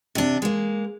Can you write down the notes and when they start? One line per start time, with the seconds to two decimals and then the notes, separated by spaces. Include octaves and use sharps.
0.15 C3 D4
0.42 G#3 A#3